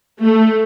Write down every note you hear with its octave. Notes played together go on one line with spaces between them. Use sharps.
A3